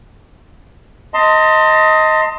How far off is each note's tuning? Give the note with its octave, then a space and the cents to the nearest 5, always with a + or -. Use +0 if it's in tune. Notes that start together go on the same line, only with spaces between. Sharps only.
D#5 +15 A5 +40 C6 +0